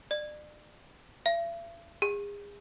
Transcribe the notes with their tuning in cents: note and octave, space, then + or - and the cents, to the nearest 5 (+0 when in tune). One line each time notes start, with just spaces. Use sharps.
D5 +35
E5 +45
G#4 -35